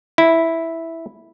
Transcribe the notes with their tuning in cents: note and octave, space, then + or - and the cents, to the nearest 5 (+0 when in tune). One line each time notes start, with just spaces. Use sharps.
E4 -5